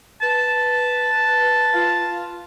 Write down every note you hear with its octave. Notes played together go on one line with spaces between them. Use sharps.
B4 A5
F4